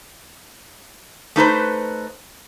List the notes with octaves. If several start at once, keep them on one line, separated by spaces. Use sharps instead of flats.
A3 D#4 B4 C5